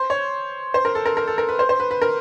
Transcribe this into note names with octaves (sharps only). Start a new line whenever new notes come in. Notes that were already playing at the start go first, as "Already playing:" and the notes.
Already playing: C5
C#5
C5
A#4
A4
A#4
A#4
A4
A#4
B4
C5
C5
B4
B4
A#4